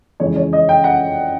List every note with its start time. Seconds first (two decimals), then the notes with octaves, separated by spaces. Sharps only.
0.20 F2 C#3 E3 G#3 C#5
0.36 C#5
0.53 D#5
0.69 G5
0.84 F#5